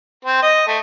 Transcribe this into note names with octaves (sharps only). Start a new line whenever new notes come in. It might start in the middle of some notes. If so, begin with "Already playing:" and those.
C4
D#5
A3